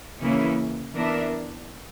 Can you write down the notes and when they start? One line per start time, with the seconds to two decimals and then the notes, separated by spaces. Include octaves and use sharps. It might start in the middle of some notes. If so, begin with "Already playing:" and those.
0.21 C#3 E3 A#3 C#4 E4
0.94 E3 B3 D4 A#4 E5